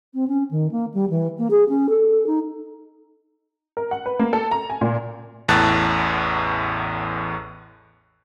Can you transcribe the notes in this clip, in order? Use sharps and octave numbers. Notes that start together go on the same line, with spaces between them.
C4
C#4
D#3
A#3
G3
E3
A#3
G#4
C#4
A4
D#4
A#4
F#5
B4
A#3
A4
A#5
G#5
A#2
A1 E2 A2 A5 F#6 A6